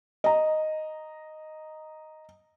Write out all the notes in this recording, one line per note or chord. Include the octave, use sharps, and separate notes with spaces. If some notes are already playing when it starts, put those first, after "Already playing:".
D#5 A#5